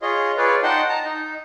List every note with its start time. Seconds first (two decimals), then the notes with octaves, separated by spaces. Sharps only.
0.02 F4 G#4 C#5 D#5 C6
0.37 F4 G#4 B4 C#5 D5
0.63 D#4 D#5 F#5 G5 A5 C6
0.89 A5 A#5
1.05 D#4